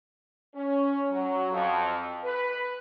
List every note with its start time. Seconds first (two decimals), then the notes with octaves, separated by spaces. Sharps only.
0.55 C#4
1.11 F#3
1.51 F2
2.24 B4